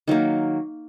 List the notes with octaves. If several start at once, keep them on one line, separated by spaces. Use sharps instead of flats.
D#3 F#3 A#3